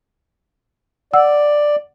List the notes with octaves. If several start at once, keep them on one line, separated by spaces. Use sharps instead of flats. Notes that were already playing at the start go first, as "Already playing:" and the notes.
D5 F#5 E6